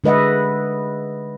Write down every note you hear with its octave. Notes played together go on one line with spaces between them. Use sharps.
D3 G#3 B4 D#5 E5 F#5